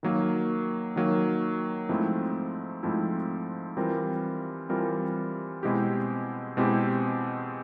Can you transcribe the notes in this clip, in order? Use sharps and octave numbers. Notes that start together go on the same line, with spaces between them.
D#3 F#3 A#3
D#3 F#3 A#3
G#2 F3 A3 C4 E4
G#2 F3 A3 C4 E4
E3 G3 C4 F4 A#4
E3 G3 C4 F4 A#4
B2 G#3 C4 E4 G4
B2 G#3 C4 E4 G4